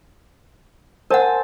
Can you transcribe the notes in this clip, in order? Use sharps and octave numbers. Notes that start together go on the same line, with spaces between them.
A#4 C5 F#5 G#5 A5